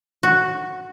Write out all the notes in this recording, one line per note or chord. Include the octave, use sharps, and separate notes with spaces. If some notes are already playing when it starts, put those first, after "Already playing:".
F#4